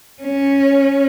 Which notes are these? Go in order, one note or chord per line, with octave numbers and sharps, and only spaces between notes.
C#4